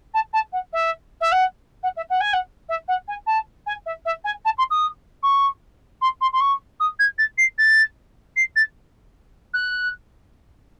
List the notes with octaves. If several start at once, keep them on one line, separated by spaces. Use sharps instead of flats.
A5
A5
F#5
E5
E5
F#5
F#5
E5
F#5
G#5
F#5
E5
F#5
G#5
A5
G#5
E5
E5
G#5
A5
C6
D#6
C#6
C6
C6
C6
C#6
D#6
G#6
A6
C7
A6
C7
A6
F#6